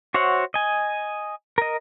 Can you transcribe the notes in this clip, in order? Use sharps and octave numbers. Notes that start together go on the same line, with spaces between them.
F#4 C5 C#5 E5 F#5
D#5 G#5
A#4 D#5